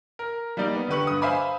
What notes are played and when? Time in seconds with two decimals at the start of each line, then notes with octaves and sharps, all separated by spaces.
0.19 A#4
0.57 G3 A#3 D#4 D5
0.75 B3
0.88 D3 G4 B4 C#6 F#7
1.07 G2 D#6
1.21 C5 E5 F5 G#5 B5 D6